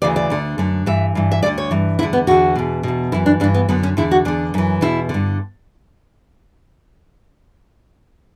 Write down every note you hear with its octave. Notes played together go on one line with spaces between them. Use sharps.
D2 C#3 E3 D5
D5
D2 D3
F#2 D3
G2 E3 E5
G2 E3
E5
D2 D3 D5
C#5
G2 E3
E2 D3 E4
B3
E2 D3 F#4
E2 B2
E2 B2
F#2 E3 E4
D4
G2 E3 D4
B3
F#2 D3 B3
C#4
E2 D3 E4
F#4
E2 D3 D4
F#2 E3
E2 B2 E4
G2 D3